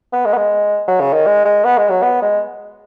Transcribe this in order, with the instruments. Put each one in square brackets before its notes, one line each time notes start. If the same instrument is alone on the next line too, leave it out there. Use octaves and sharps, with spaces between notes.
[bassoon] B3
G#3
B3
G#3
F#3
C#3
D#3
G#3
G#3
B3
G#3
F#3
B3
G#3